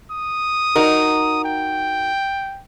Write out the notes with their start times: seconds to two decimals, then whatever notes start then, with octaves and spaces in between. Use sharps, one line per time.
0.11 D#6
0.75 D#4 F#4 A#4
1.45 G5